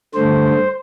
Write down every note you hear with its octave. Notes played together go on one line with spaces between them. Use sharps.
G2 D3 A3 C5